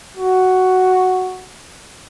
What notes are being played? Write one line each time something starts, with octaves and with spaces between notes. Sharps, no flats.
F#4